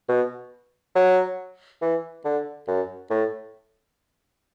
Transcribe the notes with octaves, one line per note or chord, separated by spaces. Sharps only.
B2
F#3
E3
D3
F#2
A2